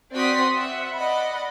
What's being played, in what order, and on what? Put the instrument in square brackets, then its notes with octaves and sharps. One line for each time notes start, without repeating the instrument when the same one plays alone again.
[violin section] C4 F#4 D5 C6 D#6 B6
E5 F#5
D5 D#5 F#5 B5